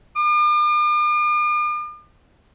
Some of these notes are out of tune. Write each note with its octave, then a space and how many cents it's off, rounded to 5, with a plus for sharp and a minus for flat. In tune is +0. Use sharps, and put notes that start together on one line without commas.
D6 +45